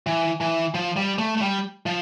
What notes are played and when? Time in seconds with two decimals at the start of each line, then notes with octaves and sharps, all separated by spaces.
0.07 E3
0.41 E3
0.74 F3
0.97 G3
1.19 A3
1.37 A3
1.42 G3
1.86 F3